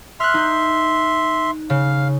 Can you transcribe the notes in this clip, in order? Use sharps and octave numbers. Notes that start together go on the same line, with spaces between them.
E5 C6 F6 F#6
D#4 G6
C#3 F5